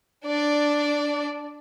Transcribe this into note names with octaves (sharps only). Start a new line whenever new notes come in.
D4 D5